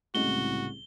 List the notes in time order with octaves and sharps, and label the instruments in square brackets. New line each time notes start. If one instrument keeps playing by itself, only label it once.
[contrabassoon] C2 [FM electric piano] A2 C#3 G#3 [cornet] F#4 [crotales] G7